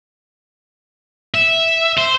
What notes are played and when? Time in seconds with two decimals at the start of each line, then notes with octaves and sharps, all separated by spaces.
1.34 E5
1.98 C5